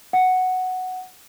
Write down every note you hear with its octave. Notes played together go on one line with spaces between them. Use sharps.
F#5